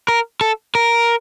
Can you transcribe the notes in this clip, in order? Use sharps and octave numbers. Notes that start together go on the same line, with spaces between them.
A#4
A4
A#4